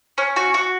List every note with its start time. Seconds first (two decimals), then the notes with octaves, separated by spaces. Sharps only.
0.18 C#4
0.36 F#4
0.54 F#4